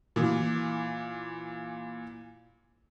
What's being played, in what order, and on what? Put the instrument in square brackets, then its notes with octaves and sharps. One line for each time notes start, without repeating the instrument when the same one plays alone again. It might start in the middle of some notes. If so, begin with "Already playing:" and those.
[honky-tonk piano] A#2 E3